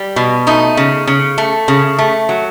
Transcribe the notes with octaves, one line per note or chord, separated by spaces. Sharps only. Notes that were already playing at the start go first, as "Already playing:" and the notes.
Already playing: G3
B2
A3 D#4
C#3
C#3
A3
C#3
A3
F#3